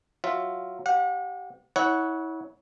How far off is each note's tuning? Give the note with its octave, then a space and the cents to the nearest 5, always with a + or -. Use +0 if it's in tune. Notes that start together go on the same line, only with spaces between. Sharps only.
F#3 +0 F4 +0 E5 +0
G4 -15 F#5 -40
E4 -30 C#5 +10 F#5 +0